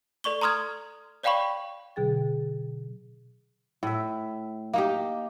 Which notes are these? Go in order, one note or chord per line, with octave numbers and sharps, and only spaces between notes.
A4 D5 C#6 G7
A#5 C6 D#6 F6 G#6
C#5 D5 F5 G5 B5 C#6
B2 D3 F#3 G#4 G5 A6
A2 E5
A#3 D#4 G4